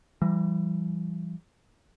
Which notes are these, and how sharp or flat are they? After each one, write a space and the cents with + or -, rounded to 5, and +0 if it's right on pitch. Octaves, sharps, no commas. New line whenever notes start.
E3 +35 G3 -10